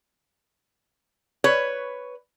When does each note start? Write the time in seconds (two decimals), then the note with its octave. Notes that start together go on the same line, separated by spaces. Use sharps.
1.44 B4 C#5